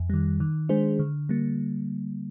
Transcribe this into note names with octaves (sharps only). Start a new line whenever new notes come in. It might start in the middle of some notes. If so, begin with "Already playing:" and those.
Already playing: F2
D#3 G3
D#3
G#3 D4 G#4 C5
D3
G3 A#3